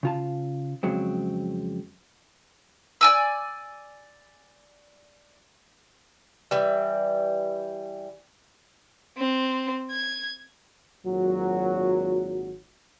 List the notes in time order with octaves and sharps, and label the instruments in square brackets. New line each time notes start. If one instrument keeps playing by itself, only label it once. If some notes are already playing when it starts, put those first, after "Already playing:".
[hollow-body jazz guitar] C#3 F4 A5
F2 C#3 F#3 G#3 C4
[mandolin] D5 G#5 E6
[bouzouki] E3 G3
[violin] C4
G#6
[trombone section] G#1 A#2 F#3